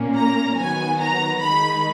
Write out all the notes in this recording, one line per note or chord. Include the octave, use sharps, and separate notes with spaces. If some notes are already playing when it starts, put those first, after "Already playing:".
Already playing: A#2 A#3 C#4
A#5
D#3 F#3 B3 G#5
A#5
D#3 G#3 D#4 B5